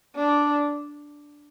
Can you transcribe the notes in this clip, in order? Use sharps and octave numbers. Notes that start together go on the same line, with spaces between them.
D4